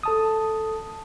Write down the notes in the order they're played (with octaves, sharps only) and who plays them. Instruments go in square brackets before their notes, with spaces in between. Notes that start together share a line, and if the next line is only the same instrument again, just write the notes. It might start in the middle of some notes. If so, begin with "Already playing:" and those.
[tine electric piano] A4 A5 D#6